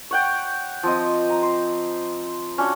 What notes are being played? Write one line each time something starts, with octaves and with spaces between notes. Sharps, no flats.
C#5 F#5 G5
F3 C4 D#5
A#5
C5
C#4 D4 F#4